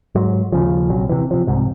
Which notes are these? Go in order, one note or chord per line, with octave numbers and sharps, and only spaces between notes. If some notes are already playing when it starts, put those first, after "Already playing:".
G#2 F#3
D#2 C#3 F3
A#1 C3 F#3
C3 E3
C3 F3
C2 G#2 C3